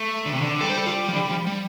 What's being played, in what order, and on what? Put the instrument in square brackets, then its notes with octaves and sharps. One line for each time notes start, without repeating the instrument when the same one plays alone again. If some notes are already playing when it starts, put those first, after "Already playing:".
Already playing: [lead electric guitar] A3
D3
C3
D3
[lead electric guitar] G3 [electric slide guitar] A4
[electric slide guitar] C5
A4
F4
F3
D3
F3
G3